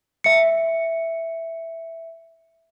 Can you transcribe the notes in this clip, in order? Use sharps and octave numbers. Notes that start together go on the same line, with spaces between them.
E5 C#7